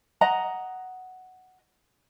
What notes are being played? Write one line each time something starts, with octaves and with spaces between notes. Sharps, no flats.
D#5 F#5 A#5